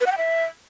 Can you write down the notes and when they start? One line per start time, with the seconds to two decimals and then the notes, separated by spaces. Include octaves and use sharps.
0.01 B4
0.06 F#5
0.12 G5
0.18 E5